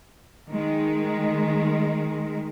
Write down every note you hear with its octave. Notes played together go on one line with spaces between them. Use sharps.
D#3 G#3